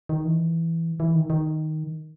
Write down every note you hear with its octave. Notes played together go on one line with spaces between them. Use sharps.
D#3
E3
E3
D#3
D#3